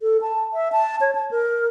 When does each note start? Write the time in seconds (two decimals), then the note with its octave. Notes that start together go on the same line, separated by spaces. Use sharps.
0.01 A4
0.21 A5
0.53 E5
0.72 A5
1.01 C#5
1.15 A5
1.31 A#4